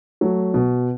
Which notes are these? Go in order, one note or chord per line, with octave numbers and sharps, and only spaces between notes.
F#3 A3
B2